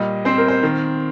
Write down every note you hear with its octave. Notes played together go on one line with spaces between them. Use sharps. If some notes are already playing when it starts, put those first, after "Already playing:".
Already playing: A#2 G3 D#5
C4 C5
A#4
C5
D#3 A#4